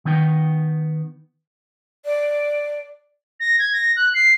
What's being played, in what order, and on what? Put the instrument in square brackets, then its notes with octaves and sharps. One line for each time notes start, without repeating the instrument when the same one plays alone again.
[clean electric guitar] D#3 B3 D#4 G5
[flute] D5
[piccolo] A#6
G#6
A#6
F#6
C7